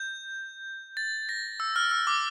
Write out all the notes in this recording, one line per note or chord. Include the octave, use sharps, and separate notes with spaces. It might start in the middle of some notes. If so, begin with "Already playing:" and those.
Already playing: G6
A6
A#6
E6
F6
E6
D6